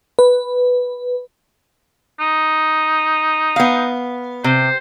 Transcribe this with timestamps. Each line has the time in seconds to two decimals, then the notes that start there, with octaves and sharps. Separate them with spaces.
0.19 B4
2.20 D#4
3.56 B3 F5
4.44 C3 C5